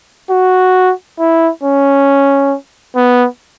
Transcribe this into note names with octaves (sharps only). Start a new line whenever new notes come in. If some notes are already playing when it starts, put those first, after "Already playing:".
F#4
E4
C#4
B3